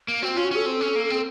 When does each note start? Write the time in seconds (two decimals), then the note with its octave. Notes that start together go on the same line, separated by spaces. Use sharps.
0.08 A#3
0.22 C4 F#4
0.34 F4
0.36 C#4
0.44 F#4
0.51 C#4 A4
0.66 C4
0.81 C#4
0.96 A#3
1.10 C4